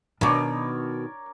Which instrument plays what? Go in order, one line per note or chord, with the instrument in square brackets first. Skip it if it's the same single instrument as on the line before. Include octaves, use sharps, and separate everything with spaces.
[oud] B2 D#3 [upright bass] D4 [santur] A#4 C#5 D5